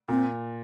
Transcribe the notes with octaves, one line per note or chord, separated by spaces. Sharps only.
A#2 C4